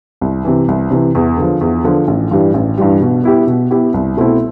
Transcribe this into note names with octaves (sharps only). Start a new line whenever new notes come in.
C2
C3 E3
C2
C3 E3
E2
D3
F3
E2
D3 F3
A1
G2 E3 G3
A1
G2 E3 G3
B2
B3 E4 G4
B2
B3 E4 G4
C2
B2 A3 C4 E4